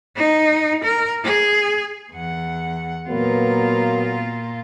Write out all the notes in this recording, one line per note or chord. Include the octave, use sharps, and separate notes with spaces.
D#4
A#4
G#4
E2 F#5
A#2 F#3 A#3 B3 F4